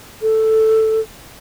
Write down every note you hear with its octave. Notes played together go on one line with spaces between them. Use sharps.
A4